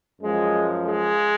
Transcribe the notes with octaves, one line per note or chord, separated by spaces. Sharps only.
F#2 F3 G#3
G#3